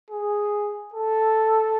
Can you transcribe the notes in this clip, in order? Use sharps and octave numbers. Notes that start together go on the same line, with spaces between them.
G#4
A4